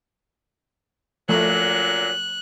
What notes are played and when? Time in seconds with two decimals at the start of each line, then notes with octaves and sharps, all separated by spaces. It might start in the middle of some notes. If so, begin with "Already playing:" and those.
1.29 A#2 D3 F3 F#3 A3 F#6